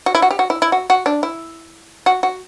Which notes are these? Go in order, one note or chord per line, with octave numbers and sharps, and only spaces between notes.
F#4
E4
F#4
G4
F#4
E4
E4
F#4
F#4
D4
E4
F#4
F#4